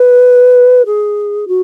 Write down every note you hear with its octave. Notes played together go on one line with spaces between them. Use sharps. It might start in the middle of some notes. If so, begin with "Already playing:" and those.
Already playing: B4
G#4
F#4